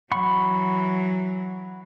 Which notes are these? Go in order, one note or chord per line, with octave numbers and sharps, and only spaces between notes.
E3 F#3 F#5 B5 C#6